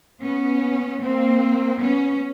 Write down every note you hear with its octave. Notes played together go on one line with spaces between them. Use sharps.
B3 C#4
A#3 C4
B3 C#4